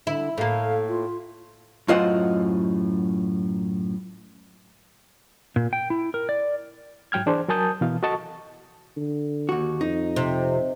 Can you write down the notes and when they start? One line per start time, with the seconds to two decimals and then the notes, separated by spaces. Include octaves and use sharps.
0.07 D3 E4
0.38 A2 A#3 F5
0.89 F4
1.88 F#2 A2 F4 C5 D#5 F#5
5.56 A#2
5.73 G5
5.90 E4
6.14 A#4
6.29 D5
7.12 G#2 F#3 G5 F6 G#6
7.26 E3 D4 G#4 C5
7.49 F#3 A#4 G#5 A5 D#6 G6
7.81 B2 E3 F5
8.03 F#4 A4 D#5 A5 C#6
8.97 D3
9.49 D#2 F#4
9.81 F2 D#4
10.16 C3